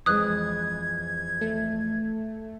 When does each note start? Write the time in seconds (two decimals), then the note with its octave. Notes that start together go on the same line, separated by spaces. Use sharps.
0.06 F2 E3 G#3 D#6 F#6 G#6
1.41 A3